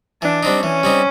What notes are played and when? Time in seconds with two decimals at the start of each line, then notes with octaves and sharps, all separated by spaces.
0.22 E3 D4
0.43 G3 C4 D#4
0.63 E3 C#4
0.83 G3 C4 D#4